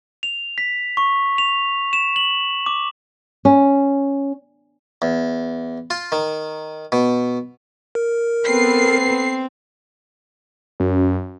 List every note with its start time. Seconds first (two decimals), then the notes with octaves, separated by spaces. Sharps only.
0.23 F7
0.58 B6
0.97 C#6
1.38 F7
1.93 E7
2.16 F#7
2.66 D6
3.45 C#4
5.02 E2
5.90 F4
6.12 D#3
6.92 B2
7.95 A#4
8.45 B3 C4 A4 B4 C7
10.80 F#2